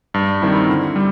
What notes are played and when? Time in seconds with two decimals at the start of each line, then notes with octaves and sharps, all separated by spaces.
0.14 G2
0.42 D#3 G3 C4 E4
0.69 D3
0.96 G3